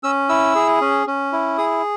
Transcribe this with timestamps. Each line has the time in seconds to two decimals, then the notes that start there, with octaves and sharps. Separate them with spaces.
0.03 C#4 E6
0.29 E4 E6
0.55 G#4
0.81 C#4
1.07 C#4
1.32 E4
1.58 G#4 D#6